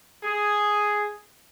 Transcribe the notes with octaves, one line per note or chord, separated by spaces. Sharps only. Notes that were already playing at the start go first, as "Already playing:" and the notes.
G#4